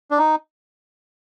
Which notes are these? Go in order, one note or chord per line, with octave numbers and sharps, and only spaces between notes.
D4
D#4